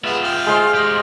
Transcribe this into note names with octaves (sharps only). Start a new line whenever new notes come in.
G#3 B3 F4 E5
F5 G5
G#3 C5
G4 D#5 F5